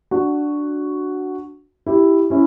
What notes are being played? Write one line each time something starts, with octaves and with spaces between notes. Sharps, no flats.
D4 F#4
E4 G4
C#4 E4